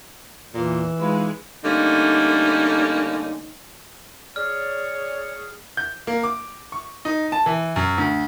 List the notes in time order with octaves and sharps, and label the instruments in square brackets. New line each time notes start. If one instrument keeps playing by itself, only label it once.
[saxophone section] E2 A#2 [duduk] E3
[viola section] G#3 [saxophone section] D#4 F4 B4
[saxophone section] D3 G3 A3 A#3 C#4 D#4
[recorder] G#4 [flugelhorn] C#5 [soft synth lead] D5 [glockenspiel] F6
[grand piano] G6
A#3
D6
C#6
D#4
A5
E3
F#2
D2